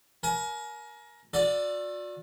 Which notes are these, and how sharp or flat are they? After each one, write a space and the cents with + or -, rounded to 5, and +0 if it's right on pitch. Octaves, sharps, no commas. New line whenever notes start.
A#4 +20 G#5 +35
F#4 -45 A4 +15 D5 +0